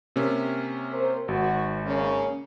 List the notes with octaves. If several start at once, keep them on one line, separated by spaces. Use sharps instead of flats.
C3 A#3 C#4
A#4 C5
G#1 F#4
C#3 A#3 C#4